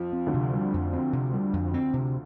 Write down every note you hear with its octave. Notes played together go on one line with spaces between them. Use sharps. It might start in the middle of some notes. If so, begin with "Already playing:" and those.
Already playing: F2 F3
C4
D2 D3
C3
G3
F2
C4
C3
G3
F2
C4
C3